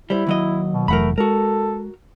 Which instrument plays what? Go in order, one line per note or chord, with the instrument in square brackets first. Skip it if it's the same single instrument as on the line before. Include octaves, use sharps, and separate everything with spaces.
[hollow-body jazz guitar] G3 C5 [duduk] E4
[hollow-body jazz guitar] D#2 F#3 D#5
[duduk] B2
[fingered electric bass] F1 E3 F#3 [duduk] A3 [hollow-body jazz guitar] A#4 F#5 B5
[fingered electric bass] G#3 [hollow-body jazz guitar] F#4 A#4 [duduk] A4